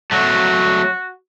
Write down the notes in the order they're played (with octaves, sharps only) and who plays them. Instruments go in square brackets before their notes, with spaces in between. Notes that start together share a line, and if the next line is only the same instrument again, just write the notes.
[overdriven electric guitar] F#3 A3 [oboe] F#4